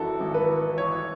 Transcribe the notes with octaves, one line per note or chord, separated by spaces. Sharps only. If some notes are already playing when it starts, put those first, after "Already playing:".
Already playing: G#1 F#2 E3 E4 F#4 A4
G#1
B4
E3
E3 C#5